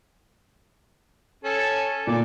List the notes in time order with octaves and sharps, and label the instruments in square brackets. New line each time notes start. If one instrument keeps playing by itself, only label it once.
[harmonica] C#4 A4
[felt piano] A#2 [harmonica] D5